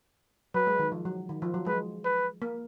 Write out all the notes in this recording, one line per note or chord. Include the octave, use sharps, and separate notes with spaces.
F#3 B4
G#3
D#3
F3
F#3
D#3
F3
F#3
G#3 B4
B4
A#3